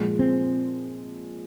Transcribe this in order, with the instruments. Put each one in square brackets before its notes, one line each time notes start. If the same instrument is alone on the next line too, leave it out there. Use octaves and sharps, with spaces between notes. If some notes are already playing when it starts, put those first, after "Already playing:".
Already playing: [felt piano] A#2 F3 G#3
[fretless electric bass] C4